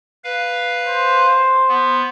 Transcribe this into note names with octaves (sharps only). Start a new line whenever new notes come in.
B4 F5
C5
B3